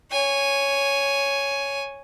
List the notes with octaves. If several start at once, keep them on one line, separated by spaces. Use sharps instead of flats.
C#5 G#5